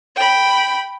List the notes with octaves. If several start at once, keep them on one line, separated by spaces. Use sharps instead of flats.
G5 B5